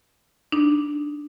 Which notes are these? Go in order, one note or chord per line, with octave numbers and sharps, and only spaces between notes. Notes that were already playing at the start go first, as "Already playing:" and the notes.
D4 D#4